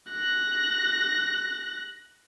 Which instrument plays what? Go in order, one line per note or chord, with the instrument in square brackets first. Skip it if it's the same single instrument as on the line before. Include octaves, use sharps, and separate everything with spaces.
[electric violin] F#6 A#6